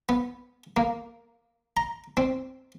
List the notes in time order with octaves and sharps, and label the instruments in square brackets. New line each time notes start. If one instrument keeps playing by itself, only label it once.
[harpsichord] B3
A#3
A#5
C4